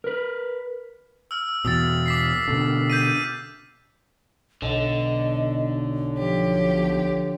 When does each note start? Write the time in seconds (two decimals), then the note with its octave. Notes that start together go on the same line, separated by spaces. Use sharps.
0.04 A#4 B4
1.31 E6 F6
1.65 E2 B2 D#6 E6 A6
2.06 D6 B6 C7
2.48 B2 D3
2.90 G6 B6 D#7
4.62 B1 D3 D#5
6.16 F3 G4 C#5